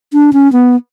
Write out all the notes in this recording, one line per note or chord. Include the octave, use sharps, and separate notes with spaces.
D4
C#4
B3